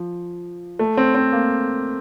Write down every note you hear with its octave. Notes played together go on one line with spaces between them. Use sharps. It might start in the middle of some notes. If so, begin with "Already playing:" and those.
Already playing: F3
A3
C4
C4
A#3